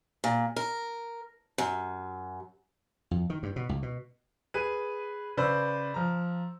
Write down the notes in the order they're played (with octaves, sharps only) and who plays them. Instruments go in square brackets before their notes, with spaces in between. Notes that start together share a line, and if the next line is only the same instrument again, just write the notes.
[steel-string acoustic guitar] A#2
A#4
F#2
[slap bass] F2
D#3
G2
B2
C#2
B2
[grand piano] G#4 B4 D#7
C#3 B4 C5 D5 E6
F3 A#5